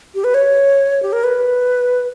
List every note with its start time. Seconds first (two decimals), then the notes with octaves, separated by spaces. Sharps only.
0.15 G4
0.24 B4
0.34 C#5
1.02 G4
1.13 A#4
1.24 B4